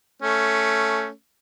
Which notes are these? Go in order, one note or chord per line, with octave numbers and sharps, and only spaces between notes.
A3 C#4